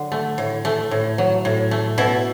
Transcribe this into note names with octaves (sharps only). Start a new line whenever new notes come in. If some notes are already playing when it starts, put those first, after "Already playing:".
Already playing: D3 F#3
A3
A2
A3
A2
F#3
A2
A3
B2 E4